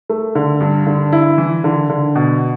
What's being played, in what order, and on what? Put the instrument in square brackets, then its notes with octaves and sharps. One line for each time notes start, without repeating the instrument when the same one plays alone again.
[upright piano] A3
D3
G2
D3
E4
E3
D3
D3
B2